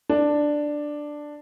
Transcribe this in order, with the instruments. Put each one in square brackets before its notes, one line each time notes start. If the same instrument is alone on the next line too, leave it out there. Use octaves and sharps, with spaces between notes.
[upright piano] D4